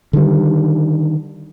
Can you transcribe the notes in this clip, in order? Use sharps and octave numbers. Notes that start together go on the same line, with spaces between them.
D3 D#3 G3